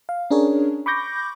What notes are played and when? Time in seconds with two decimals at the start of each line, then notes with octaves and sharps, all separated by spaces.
0.09 F5
0.31 C#4 D4 G#4 A#4 C#5
0.86 B5 C#6 D6 G6 A#6